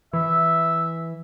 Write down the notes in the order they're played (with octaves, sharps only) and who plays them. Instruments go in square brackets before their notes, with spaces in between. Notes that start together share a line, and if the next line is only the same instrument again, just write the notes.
[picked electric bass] E3 [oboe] E5